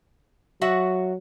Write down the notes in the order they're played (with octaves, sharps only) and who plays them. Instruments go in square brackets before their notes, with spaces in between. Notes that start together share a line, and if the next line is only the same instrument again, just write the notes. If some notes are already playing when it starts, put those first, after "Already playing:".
[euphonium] F#3 [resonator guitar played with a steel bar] F#4 E5 F#5